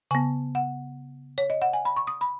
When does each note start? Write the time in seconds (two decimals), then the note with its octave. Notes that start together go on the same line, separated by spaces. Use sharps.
0.11 C#3 B3 G#5
0.55 F#5
1.38 C#5
1.50 D#5
1.62 F#5
1.73 G#5
1.85 B5
1.97 C#6
2.07 D#6
2.21 B5